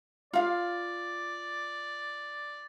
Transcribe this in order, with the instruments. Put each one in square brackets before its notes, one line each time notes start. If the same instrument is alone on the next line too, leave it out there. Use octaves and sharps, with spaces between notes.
[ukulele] F4 F5 [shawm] D5